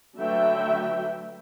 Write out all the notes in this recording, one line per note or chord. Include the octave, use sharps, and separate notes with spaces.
D3 F#3 A3 B4 E5 G5